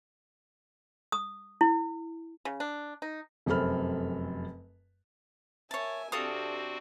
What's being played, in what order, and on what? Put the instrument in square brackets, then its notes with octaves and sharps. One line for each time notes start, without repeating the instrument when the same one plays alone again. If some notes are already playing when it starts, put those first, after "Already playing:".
[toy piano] D#6
E4
[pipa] C#3
D4
D#4
[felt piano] F1 F#2 C4 A4 B5 F6
[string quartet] A#4 E5 G#5 [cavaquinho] C#5 A5
[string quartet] C3 D4 [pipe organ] C4 F#4 [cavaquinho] A4 F5 D#6